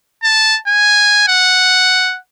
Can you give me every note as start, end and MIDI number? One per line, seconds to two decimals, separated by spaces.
0.23 0.58 81
0.67 1.27 80
1.28 2.17 78